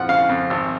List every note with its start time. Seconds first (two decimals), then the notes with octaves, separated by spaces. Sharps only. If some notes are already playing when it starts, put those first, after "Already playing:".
Already playing: F2 F3 F#5
0.09 C#3 F5
0.29 F2
0.50 G#1